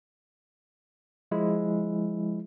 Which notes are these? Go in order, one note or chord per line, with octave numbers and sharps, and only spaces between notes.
F3 G#3 E4